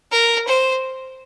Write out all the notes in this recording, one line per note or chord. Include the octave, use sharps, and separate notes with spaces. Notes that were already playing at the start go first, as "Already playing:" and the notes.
A#4
C5